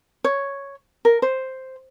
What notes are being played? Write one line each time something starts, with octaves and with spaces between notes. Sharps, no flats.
C#5
A#4
C5